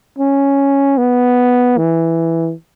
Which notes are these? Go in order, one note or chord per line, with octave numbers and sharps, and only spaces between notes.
C#4
B3
E3